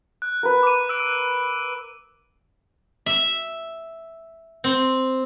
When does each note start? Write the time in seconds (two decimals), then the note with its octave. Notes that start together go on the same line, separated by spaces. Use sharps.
0.22 F#6
0.43 A#4 B4
0.63 D6 D#7
0.89 E6 D7
3.06 E5
4.64 C4